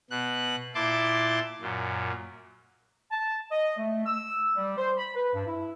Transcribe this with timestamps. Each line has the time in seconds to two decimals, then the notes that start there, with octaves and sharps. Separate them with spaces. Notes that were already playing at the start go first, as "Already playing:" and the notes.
0.10 B2 F#6
0.75 A#2 E4 A5 C6 D6
1.61 F#2 A#2
3.11 A5
3.52 D#5
3.78 A3
4.06 E6
4.56 G3
4.77 C5
4.98 B5
5.15 B4
5.34 G2
5.47 E4